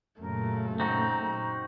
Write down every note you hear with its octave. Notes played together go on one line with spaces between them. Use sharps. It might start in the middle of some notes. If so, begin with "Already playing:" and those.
F#2 A#2 C#3 A3 A#4
C4 D#4 F#4 A#5